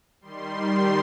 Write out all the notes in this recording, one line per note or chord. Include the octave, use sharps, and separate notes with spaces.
D#3 G3 C6